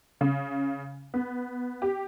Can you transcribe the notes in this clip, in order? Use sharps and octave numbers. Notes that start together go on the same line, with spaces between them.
C#3
B3
G4